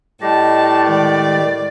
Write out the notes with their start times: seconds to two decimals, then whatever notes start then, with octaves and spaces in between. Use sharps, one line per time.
0.22 A2 G3 G4 D#5 A5
0.87 D#3 G#3 D5